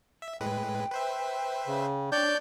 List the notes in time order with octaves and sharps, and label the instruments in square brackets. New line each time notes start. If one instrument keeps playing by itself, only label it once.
[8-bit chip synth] E5
[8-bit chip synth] A2 G#3 B4 [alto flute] G5
[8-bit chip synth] B4 C5 E5
[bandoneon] C#3
[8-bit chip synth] D4 C#5 [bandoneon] D5 G6